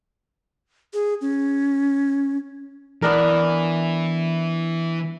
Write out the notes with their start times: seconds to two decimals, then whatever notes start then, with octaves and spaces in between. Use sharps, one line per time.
0.94 G#4
1.21 C#4
3.02 E3 B3 D4 A#4